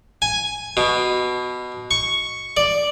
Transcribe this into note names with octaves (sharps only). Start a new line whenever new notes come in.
G#5
B2
C#6
D5